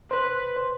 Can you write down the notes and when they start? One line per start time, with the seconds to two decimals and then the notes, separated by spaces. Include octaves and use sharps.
0.10 B4 C5
0.56 C5